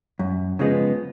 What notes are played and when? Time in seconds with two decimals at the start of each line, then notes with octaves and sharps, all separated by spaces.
0.19 F#2
0.59 C#3 F3 G#3 B3